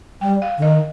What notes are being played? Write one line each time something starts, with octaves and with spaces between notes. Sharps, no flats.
G3 G5
F5
D3
D#3 D#5